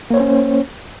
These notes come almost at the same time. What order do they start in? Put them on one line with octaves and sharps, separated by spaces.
A#3 C#5 C5 C#4